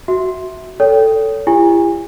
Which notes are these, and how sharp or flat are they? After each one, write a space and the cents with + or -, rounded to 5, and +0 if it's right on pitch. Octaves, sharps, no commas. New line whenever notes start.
F#4 +0 E5 -10
A4 +10 C#5 +30 G5 +0
E4 +45 G4 +40 G#5 -30